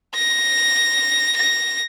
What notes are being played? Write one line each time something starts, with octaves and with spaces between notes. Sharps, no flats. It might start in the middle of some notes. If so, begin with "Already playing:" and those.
A#6
A#6